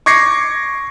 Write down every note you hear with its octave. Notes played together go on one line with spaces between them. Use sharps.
C#6 D6 G#6 A#6 C7 C#7